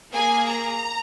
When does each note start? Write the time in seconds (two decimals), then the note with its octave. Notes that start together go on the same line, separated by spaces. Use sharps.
0.12 A#3 G#4 G#5
0.48 A#5